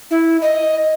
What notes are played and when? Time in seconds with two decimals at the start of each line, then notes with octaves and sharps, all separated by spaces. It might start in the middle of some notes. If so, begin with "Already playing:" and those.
0.11 E4
0.42 D#5